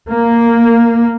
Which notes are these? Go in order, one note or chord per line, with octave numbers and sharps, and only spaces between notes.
A#3